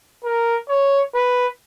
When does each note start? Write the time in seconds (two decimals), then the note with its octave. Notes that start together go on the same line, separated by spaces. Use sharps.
0.24 A#4
0.69 C#5
1.15 B4